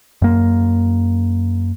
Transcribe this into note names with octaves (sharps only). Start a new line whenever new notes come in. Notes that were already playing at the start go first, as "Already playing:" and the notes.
F#2 A#3